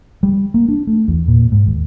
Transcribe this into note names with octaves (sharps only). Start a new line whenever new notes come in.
G3
A#3
D4
A3
E2
A#2
G#2
D#2